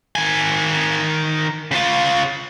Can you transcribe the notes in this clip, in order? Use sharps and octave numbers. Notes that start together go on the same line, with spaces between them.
D#3 G#5
C#3 F4